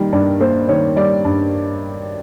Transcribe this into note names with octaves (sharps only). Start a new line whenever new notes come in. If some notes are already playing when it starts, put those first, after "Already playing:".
Already playing: D#3 G3 A#3
G2 D5
A#3 C5
D#3 C#5
G3 D5
G2